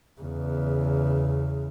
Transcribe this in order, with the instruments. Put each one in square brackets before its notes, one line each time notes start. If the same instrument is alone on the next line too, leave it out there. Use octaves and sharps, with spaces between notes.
[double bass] E2 C#3